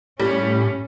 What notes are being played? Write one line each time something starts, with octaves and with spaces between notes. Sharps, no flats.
A2 G3 C#4